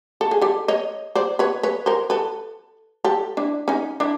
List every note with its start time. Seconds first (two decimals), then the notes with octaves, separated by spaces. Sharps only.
0.21 A4
0.31 G#4
0.41 G4 A4
0.68 C#5 D#5
1.15 C5 D5
1.39 B4 C#5
1.63 B4 C#5
1.86 A#4 C5
2.10 A4 B4
3.04 G4 A4
3.37 D4 E4
3.68 C#4 D#4
4.00 D4 E4